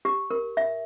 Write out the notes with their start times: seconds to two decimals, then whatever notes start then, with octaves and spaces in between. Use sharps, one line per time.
0.05 G4
0.31 A#4
0.57 E5